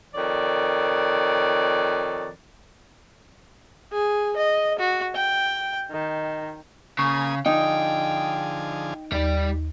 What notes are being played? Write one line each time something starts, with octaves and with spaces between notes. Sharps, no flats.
F2 D#3 C#5 D5
G#4
D#5
F#4
G5
D#3
C#3 A#3 G#5 C#6 D#6
D3 F3 D#4 G#4 G5
D#2 G3 D5